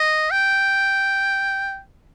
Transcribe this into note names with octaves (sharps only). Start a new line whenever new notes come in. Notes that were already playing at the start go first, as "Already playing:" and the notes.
Already playing: D#5
G5